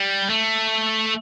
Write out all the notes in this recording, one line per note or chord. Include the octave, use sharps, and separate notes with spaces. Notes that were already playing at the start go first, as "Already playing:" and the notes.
Already playing: G3
A3